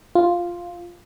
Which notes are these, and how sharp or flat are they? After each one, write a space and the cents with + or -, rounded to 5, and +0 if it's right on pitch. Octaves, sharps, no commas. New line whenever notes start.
F4 +0